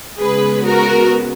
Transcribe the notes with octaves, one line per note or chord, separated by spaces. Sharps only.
C#3 G#3 B3 G#4 B4
F#4 A#4